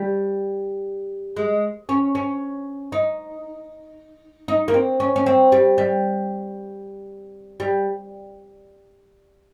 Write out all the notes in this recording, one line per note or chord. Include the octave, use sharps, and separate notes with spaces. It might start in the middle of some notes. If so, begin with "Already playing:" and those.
Already playing: G3
G#3
C#4
C#4
D#4
D#4
A#3
C4
C#4
C#4
C4
G3
G3
G3